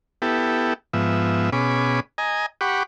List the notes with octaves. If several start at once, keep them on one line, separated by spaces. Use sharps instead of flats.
B3 E4 G4 A4
G#2 F3 B3 E5
B2 C#4 G#4 B5 D6
D#5 G#5 A#5
G4 F#5 B5 C#6 D6